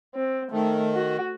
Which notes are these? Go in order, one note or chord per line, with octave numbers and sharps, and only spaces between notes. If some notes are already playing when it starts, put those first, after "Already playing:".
C4
D#3 A3
F#4